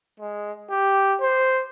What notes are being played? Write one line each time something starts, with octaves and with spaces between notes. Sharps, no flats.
G#3
G4
C5